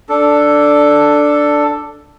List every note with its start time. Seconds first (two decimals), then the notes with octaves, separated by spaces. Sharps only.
0.09 D4 A4